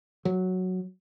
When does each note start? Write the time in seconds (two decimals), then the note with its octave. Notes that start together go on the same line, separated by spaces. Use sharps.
0.25 F#3